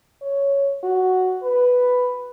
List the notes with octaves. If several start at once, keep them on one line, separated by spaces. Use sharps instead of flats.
C#5
F#4
B4